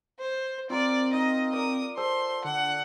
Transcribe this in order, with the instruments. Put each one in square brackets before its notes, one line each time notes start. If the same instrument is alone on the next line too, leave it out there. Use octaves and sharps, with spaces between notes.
[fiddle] C5
[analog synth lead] C4 [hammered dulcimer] F4 A#4 [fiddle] D5
[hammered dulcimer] D#4 [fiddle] D#5
[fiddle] A#4 D#6 [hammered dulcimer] D5
[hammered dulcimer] A4 [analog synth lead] C5 [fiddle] C6
[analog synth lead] D3 [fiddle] F#5